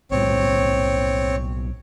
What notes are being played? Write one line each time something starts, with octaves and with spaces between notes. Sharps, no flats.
B1 A2 G3 C4 C#5